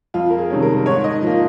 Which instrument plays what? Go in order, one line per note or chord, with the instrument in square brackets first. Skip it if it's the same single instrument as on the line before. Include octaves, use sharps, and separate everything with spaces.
[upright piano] F2 F4
A#4
G#4
C3 D#3 G3 C#4
A#4
G#2 C#5
D#5
F3 A#3